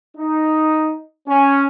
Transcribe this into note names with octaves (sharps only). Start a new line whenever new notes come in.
D#4
C#4